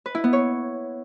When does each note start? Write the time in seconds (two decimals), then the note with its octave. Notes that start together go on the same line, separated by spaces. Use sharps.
0.06 B4
0.15 E4
0.24 B3
0.33 C#5